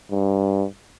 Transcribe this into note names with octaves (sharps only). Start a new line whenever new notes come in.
G2